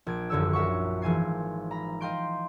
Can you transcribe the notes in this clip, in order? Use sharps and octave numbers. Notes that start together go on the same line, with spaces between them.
A#1 G#6 D7
D#1 F#2 D3 C#5 E6
A#4 E5 F#5 C#6
G#1 E3 F3 G#5 G#6 C7
A#5 B5
D#5 F5 G5 C6 G6 D7